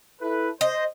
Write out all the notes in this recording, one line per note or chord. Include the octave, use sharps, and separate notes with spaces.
E4 A4 B4
C5 D#5